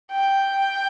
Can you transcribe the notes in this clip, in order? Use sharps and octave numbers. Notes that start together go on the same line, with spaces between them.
G5